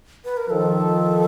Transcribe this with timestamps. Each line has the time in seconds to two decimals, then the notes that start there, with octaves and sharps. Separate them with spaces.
0.25 B4
0.37 A#4
0.50 D#3 F3 A4